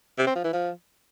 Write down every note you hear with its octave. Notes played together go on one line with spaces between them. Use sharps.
C3
C4
F3
E3
F3